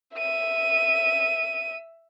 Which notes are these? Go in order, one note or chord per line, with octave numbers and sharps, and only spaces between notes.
E5 D#7